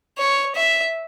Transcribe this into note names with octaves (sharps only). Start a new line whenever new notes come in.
C#5
E5